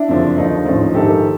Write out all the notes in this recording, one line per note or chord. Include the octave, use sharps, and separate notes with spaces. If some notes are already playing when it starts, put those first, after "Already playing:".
Already playing: D4 E4
F#1 F2 D3 F3
D#2 D3 F3 D#4
A1 G#2 F3
A#1 G#2 D#3 G4 A4